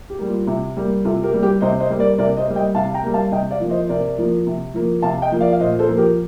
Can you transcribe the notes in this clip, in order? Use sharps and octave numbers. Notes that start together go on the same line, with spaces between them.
G4
G3 A#3
F4
C3
G3 A#3
C3 F4 A4
G4 A#4
G3 A#3
G4 A#4
C3 C5 D#5
C5 D#5
G3 A#3
A#4 D5
C3 A#4 D5
C5 D#5
G3 A#3
D#5 G5
C3 F5 A5
G5 A#5
G3 A#3
F5 A5
C3 D#5 G5
D5 F5
F3 A#3
C5 D#5
C5
C3 A#4 D5
F3 A#3
C3
F3 A#3
C3 F5 A5
D#5 G5
F3 A#3
D5 F5
F5
A#2 C5 D#5
A4 C5
F3 A#3
G4 A#4